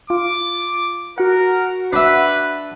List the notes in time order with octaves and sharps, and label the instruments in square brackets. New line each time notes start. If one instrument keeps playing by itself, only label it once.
[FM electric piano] F4 [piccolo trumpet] D6
[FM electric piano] F#4 F#5 [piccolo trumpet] A#4
[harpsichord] D4 E5 [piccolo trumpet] B4